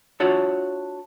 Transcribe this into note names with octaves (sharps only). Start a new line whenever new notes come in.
D4 F4 F#4 C#5 E5